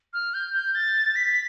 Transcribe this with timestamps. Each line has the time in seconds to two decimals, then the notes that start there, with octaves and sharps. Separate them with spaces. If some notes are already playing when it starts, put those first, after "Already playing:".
0.13 F6
0.34 G6
0.54 G6
0.75 A6
1.16 B6